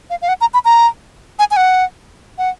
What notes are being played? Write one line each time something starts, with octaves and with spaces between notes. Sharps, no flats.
F5
F5
F#5
A#5
B5
A#5
G#5
G#5
F#5
F#5